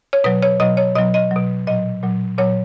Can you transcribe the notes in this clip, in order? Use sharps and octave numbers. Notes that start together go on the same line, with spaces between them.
C#5
B2 F#3 B4
C#5
B2 F#3 D#5
C#5
B2 F#3 D#5
D#5
B2 F#3
A#2 F#3 D#5
A#2 F#3
A#2 F#3 C#5